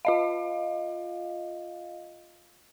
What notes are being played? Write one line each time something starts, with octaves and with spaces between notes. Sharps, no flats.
F4 D#5 F5